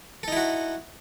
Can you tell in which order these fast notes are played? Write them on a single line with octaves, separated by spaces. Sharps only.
A4 D#4 E4 F#4